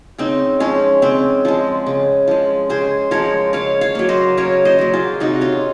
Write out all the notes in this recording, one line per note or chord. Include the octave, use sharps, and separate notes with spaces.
C#3 C4 D#4
F3 G#3 C#4
C#3 C4
F3 G#3
C#3
F3 G#3
C#3 G#4 C5
F3 G#3 A#4 C#5
C#3 C#5 F5
C#5 F5
F#3 A#3
C5 D#5
C#3 A#4 C#5
C5 D#5
F#3 A#3
F4 G#4
C3 D#4 F#4
C#4 F4